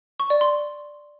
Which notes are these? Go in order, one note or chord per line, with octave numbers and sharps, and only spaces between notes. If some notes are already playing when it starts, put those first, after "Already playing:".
C#6
D5
C6